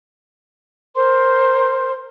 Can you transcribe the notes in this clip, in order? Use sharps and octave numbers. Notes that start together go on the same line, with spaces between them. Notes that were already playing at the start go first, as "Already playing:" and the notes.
A#4 C5 C6